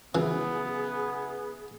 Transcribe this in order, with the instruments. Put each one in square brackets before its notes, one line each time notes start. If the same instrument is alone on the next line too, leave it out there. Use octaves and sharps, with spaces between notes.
[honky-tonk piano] C#3 F#3 E4 [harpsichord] E3 [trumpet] B3 [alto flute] G#4